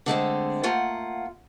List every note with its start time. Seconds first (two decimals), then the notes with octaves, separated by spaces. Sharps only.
0.06 D3 G#3 A3 C4
0.63 A3 A#3 F4 F#5